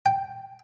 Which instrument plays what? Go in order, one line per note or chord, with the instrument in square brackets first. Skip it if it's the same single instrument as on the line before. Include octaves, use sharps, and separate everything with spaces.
[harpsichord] G5